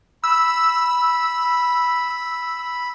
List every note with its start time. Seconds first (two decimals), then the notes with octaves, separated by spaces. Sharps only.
0.24 B5 E6